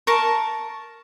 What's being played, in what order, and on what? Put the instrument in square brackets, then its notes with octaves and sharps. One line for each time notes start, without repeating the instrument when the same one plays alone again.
[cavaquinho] A#4 A5 C#6